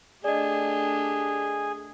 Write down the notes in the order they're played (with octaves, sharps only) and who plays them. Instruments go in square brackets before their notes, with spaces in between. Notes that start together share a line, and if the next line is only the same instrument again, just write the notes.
[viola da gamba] A3 D4 G4 [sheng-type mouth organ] G#4 [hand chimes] D5 D#5